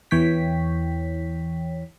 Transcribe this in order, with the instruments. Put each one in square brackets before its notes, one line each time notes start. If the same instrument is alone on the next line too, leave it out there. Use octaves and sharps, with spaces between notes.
[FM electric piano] E2 E3 C#5 G5 B6